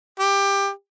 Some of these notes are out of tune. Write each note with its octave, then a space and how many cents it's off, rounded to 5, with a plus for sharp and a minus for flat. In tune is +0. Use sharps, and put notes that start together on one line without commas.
G4 +20